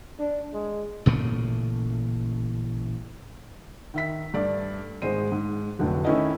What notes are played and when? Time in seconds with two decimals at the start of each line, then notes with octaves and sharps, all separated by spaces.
0.19 D4
0.54 G#3
1.06 A1 A#2 C#3 A3
3.94 D#3 E5 B6
4.34 G2 A3 D5
5.02 G#1 G#3 C5 D#7
5.32 G#2
5.79 F1 A2 D3 F#3
6.05 D#3 A3 C#4 E4 B4 D#5